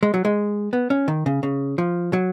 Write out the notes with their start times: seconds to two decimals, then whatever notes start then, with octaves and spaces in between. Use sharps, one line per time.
0.03 G#3
0.14 F#3
0.25 G#3
0.73 B3
0.90 C#4
1.08 D#3
1.26 C#3
1.43 C#3
1.78 F3
2.13 F#3